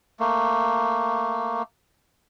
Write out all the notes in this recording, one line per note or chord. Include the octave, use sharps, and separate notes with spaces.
A3 A#3